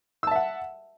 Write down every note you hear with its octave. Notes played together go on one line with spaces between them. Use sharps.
E5 F#5 A5 E6